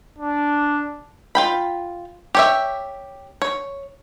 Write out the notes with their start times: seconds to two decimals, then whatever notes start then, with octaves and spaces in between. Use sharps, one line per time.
0.19 D4
1.35 F4 G5 B5
2.35 G4 C#5 E5
3.42 C#5